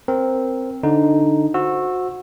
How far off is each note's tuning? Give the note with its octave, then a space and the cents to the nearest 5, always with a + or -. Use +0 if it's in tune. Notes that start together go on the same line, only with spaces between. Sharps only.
C4 +0 A#4 +0
D3 +0 D#4 +0
F#4 -20 C5 +0 E6 +0